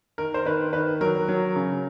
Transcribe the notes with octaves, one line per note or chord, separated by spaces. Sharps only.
D#3 A#4
C5
D#3 B4
D#3 B4
F#3 A#4
F#3
C#3